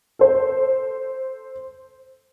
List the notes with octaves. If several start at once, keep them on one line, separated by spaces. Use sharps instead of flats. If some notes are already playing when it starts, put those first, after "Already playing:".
A4 C5